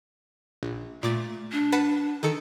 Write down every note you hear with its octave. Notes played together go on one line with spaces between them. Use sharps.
A#1
A#2 A3 D6 A6
D4
B4 F#5 A5
D#3 A4 C#7